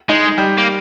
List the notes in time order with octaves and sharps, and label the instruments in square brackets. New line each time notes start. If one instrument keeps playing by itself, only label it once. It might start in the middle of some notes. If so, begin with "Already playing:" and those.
[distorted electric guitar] G#3 [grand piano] D#4
[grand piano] G3
[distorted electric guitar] A#3